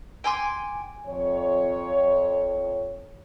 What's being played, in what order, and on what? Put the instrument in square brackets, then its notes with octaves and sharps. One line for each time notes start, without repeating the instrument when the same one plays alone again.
[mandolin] G5 G#5 C6 D6
[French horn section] F2 C#5